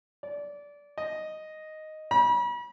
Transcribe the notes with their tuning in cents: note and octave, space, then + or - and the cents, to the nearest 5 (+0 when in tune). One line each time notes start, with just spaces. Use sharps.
D5 -20
D#5 +0
B5 -40